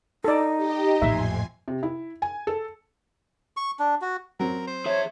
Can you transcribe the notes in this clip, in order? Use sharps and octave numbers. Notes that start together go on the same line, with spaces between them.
D#4 A4 D5
G4 D#5
A1 F2 A#2 E5 G#5 C6
C3
E4
G#5
A4
C#6
D4
F#4
F#3 C4 A#4
C5
G#4 C#5 E5